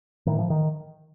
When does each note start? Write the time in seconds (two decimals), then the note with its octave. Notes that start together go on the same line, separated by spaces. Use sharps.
0.27 A2 D#3
0.39 F3
0.50 D#3